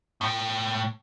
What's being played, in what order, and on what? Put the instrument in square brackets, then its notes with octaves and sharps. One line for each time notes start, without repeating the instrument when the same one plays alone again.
[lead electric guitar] A2 G5